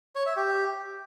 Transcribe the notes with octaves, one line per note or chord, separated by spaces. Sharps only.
C#5
E5
G4